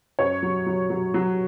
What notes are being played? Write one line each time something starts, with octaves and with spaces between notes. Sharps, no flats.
F#2 C#5
F#3
F#3
F#3
F#3